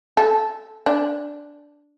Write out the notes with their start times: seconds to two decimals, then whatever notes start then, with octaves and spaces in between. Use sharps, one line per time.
0.17 A4
0.86 D4